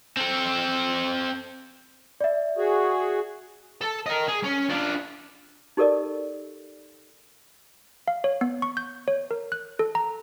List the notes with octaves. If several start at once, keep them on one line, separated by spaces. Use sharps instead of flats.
C4 A4
D5 E5
F#4 G#4
A4
A#4 D#5
G#4
C#4
D4 F4
D#4 G4 A4 A#4 D5 D#5
F5
C#5
B3
C#6
G6
C#5
A#4
F#6
A4
A#5